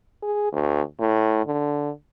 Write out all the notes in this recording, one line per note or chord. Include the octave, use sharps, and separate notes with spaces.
G#4
D2
A2
D3